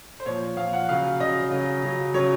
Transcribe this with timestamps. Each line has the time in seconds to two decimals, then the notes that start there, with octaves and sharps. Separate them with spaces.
0.20 C5
0.26 A#2 F3 C#5
0.57 A#2 F3 F5
0.73 F#5
0.89 C#3 F#3 F5
1.20 C#3 F#3 D#5
1.51 C#3 F#3
1.83 C#3 F#3
2.14 C#3 F#3 C#5